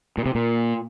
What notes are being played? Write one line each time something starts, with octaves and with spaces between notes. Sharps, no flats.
A#2
C3
A#2